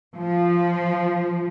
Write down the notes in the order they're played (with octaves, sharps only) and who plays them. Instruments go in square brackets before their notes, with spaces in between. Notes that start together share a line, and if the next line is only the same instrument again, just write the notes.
[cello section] F3